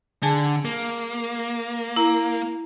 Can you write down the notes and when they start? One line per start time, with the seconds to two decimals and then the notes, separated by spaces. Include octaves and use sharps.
0.23 D3 G#4 G#5 A5
0.65 A#3
1.96 E4 A#5